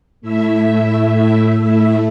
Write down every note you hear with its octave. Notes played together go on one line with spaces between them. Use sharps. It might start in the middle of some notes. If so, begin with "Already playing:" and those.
A2 A3 E4 E5
A2 A3 E4 E5